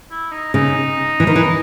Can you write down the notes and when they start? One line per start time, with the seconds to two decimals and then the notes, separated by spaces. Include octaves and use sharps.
0.11 E4
0.32 D#4
0.54 C#3 D#4
1.20 E3
1.27 D#3
1.36 E3